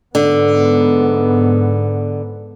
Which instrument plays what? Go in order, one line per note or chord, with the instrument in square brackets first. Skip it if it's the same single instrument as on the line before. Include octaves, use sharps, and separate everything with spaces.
[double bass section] G#2 B3 [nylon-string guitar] D3